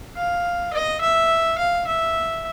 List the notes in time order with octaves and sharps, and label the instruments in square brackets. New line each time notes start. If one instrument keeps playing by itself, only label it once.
[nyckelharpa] F5
D#5
E5
F5
E5